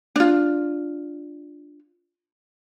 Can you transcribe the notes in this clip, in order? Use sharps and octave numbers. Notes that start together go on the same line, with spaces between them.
D4 F4